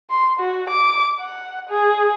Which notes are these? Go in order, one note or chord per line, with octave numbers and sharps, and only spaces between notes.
C6
F#4
D6
F#5
G#4